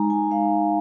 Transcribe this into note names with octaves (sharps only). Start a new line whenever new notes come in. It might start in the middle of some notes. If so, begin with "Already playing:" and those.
Already playing: G#3 D#4 G#5 A#5
G#5
G#3 D#4 F5